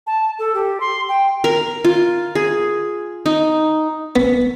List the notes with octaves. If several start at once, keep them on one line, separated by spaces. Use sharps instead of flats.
A5
A4
G4
C6
G5
A#4
F4
G#4
D#4
B3